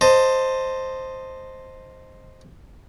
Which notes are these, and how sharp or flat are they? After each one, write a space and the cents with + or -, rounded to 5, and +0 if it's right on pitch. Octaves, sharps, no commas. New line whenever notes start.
C5 +0 D#5 +0 A5 +15